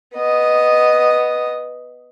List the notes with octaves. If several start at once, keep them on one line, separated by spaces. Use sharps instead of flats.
B3 D#5